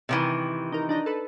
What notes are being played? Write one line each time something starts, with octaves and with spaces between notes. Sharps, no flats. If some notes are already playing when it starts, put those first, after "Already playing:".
C3 D#3 E3
D#4 A#4
D4 D#4 A#5
A4 B4